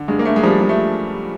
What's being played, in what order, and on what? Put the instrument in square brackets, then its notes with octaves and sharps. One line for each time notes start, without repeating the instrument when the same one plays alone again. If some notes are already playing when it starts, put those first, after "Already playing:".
Already playing: [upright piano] D3
G2 G#3
A#3
G2 A3
G#3
F3 G3
F3 G#3
A3